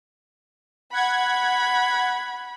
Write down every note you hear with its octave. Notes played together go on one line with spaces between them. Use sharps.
F#5 B5 G#6